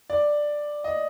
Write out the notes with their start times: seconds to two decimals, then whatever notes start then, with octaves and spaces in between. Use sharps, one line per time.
0.10 D5
0.84 D#5